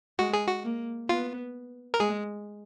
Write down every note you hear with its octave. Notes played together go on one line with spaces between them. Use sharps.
G#3 F#4
G#4
F#4
A#3
B3 F4
A#4
G#3 G#4